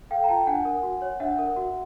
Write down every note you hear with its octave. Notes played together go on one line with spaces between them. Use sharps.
A4 F5 G5
A#5
F4 G5 A5
D4 F#5 G#5
A#4
F#4
C#5
D4 E5 F#5
A#4
F#4